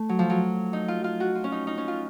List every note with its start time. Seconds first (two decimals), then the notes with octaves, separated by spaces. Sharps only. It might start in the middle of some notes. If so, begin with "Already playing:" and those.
Already playing: A3
0.09 F#3
0.19 F3
0.30 F#3
0.73 D#4
0.88 F4
1.04 F4
1.20 F#4
1.35 F4
1.44 C#4
1.52 D#4
1.67 D#4
1.78 C#4
1.88 F4